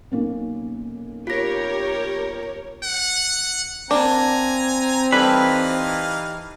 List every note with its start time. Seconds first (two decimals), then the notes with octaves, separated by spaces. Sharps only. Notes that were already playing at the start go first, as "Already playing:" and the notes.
0.11 B1 A#3 C#4
1.27 F4 G4 A#4 C#5 A#6
2.84 F#5
3.91 A#3 C4 D4 G#5 A#5
5.12 E3 G3 D#4 A4 B4 F5